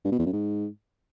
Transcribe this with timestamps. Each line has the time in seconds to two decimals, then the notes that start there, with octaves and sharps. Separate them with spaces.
0.05 G2
0.12 B2
0.19 E2
0.26 F#2
0.33 G#2